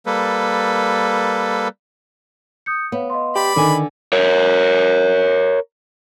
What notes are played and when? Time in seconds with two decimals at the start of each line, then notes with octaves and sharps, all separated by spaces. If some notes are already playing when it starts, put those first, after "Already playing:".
0.06 G3 A#3 A4 B4
2.66 D#6 G6 C#7
2.92 B3 C#5 F5
3.10 D#5 F5 C6
3.36 G4 D5 B5
3.56 D3 D#3 G#5 D6
4.13 A#4 C#5